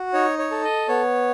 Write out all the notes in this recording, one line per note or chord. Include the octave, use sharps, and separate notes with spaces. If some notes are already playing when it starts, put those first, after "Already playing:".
Already playing: F#4
D#4 C#5
C#5
A4
D#5
B3 C#5